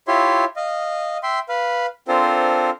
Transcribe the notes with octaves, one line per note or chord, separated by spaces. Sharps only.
E4 F4 G4 C#5 E5 C6
D#5 F5
E5 G5 C6
B4 F5
C4 D4 F4 A4 A#4 C5